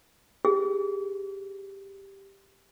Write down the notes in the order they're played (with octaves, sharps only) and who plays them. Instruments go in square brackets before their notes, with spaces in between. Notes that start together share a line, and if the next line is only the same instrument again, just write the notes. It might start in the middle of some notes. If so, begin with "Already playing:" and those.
[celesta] G4 [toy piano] G#4